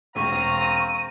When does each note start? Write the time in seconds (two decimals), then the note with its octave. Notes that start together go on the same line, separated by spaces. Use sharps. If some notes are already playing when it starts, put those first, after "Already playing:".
0.16 E1 C4 F5 A#5 C#6 D#7